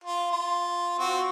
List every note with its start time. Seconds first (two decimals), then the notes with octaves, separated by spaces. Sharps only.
0.04 F4
0.32 F4
0.99 C4 F4 F#4